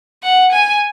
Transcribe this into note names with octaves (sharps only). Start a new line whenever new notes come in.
F#5
G#5